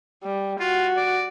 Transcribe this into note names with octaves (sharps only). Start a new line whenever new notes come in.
G3
F4 F#4
D5